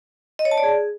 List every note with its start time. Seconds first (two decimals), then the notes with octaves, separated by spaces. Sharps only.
0.39 D#5
0.45 C#5
0.51 A5
0.58 D5
0.64 G#4